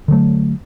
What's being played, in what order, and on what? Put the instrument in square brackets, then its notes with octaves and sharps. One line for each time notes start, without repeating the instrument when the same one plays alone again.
[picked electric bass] D3 F#3 A3